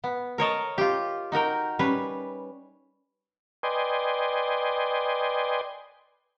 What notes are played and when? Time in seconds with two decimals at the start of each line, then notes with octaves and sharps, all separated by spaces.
0.04 B3
0.38 A#4 C#5 D#5 A5
0.78 F4 G4
1.32 D#4 F#4 A#4 G5
1.79 G3 C#4 B4
3.63 B4 D5 D#5 G5 G#5 C6